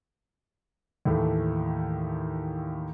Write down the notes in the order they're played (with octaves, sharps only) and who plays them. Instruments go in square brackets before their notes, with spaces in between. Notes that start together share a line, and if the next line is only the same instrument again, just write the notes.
[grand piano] D#2 A2 E3 A3